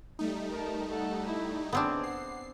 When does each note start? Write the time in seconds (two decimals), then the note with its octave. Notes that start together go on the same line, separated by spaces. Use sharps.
0.19 G3 A3 D#4
0.51 A#4 A5
0.88 A4 F#5
1.26 E4
1.72 B3 C4 D4 G#4
2.04 F#5 C7